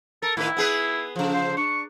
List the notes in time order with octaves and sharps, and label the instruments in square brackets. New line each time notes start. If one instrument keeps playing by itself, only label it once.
[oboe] A4 [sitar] A#4
[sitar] A2 D#3 B4 [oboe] E4
[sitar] B3 G#4 B4
C#3 F3
[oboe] C5
[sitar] D4 [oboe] C#6